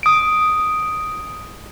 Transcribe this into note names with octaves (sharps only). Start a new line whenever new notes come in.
D#6 D7